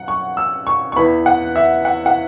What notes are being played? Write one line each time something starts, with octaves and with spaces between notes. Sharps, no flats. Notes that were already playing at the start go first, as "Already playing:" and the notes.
Already playing: F#2 F#5
C#6
E6
C#6
C#6
E2 E3 B3 B5
F#5
E5
F#5
F#5